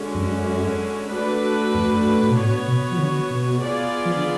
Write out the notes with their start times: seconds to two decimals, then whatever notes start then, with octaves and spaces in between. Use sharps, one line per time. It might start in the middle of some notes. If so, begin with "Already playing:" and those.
Already playing: D3 G#3 C#4 F#4
0.15 F2
0.18 F#2
1.11 A3 D4 F#4 B4
1.74 F2
1.90 F#2
2.06 F#2
2.21 A2
2.29 B2
2.37 A2 B3 F#4 C#5
2.68 B2
2.91 F3
2.98 D3
3.30 B2
3.61 B3 F4 G#4 D5
4.05 F3
4.15 D3